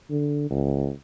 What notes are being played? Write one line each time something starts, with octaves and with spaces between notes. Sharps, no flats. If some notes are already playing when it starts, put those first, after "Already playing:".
D3
C#2